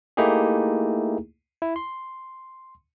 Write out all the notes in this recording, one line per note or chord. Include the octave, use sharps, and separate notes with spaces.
A3 A#3 D#4 E4 G4 G#4
E4
C6